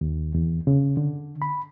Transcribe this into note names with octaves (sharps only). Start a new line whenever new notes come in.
D#2
E2
C#3
D3
B5